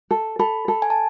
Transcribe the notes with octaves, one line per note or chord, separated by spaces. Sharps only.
A4
A4 B5
A4
G#5
A5